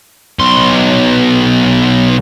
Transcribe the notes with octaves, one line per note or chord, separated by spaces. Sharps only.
B1 C6